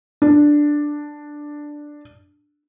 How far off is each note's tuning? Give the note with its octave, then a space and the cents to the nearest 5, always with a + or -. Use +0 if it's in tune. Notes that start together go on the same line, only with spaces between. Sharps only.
D4 +5